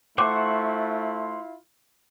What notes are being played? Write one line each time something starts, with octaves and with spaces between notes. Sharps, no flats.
A3 E4 F4 C5 F#5 C#6 D6